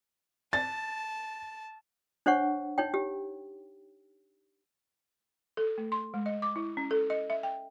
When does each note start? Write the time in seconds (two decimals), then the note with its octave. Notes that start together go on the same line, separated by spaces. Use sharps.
0.53 A5 A6
2.26 D4 C5 C#5 F#5 C#6
2.78 D#4 C#5 G5
2.94 G4
5.57 A4
5.78 A3
5.92 C6
6.14 G#3
6.26 D#5
6.42 D6
6.56 E4
6.77 C#4
6.91 A4
7.10 D#5
7.30 E5
7.43 G5